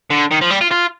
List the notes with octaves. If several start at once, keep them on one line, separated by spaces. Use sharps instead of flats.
D3
D#3
F3
G3
F4
F4